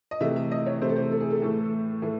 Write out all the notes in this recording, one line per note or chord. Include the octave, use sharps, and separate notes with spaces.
D#5
C3 E3 A3 E5
E5
D#5
C#5
C3 E3 A3 C5
A4
C5
A4
G#4
A4
A2 E3 A3
A2 E3 A3